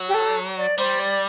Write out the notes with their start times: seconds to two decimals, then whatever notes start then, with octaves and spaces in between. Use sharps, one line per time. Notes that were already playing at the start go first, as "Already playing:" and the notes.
Already playing: F#3
0.08 G4
0.14 A4
0.58 D5
0.78 G3 C5
0.99 D5